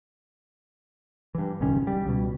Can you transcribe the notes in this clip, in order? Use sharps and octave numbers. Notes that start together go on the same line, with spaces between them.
G2 E3
D1 C2 D#3 C#4
G3
C#2 B2